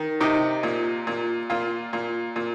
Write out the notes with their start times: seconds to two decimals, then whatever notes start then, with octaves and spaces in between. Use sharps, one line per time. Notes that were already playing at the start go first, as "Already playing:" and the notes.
Already playing: D#3
0.20 C3 D#4
0.63 A#2
1.07 A#2
1.50 A#2 F4
1.93 A#2
2.36 A#2